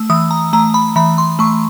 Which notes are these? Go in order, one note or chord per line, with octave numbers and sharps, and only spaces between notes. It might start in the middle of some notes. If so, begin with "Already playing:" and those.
Already playing: A3 E6
E3 D#6
A#5
A3 A#5
B5
E3 B5
C6
A3 C#6